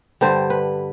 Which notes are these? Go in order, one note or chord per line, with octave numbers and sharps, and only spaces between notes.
G2 D3 G3 C5
B4